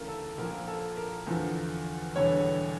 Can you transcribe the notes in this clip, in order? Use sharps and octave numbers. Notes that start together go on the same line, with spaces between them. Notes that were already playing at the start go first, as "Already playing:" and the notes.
Already playing: D2 C#3 E3 A3 A#4
A4
A#1 A#2 F3 A#4
A4
A#4
E2 D3 F3
E1 E2 D3 G3 C#5